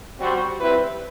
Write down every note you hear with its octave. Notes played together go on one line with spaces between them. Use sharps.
G3 C4 F#4
G3 C4 E4 B4